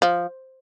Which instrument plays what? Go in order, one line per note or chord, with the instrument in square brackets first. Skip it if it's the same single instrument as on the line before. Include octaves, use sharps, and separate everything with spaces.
[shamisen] F3